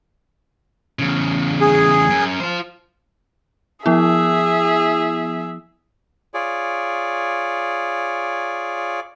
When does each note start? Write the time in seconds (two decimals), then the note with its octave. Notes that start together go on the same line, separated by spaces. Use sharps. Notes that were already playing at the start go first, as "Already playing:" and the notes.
0.99 E2 C#3
1.61 G#4
2.10 F#2
2.40 F4 C5
3.86 F3 B3 E4 G#4 E5
6.34 F4 G#4 C#5 D5